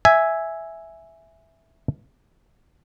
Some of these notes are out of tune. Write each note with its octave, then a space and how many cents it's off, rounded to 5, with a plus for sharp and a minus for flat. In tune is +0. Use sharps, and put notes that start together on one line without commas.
E5 +0 G#5 +0